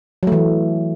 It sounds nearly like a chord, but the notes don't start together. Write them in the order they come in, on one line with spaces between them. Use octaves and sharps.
F#3 A3 E3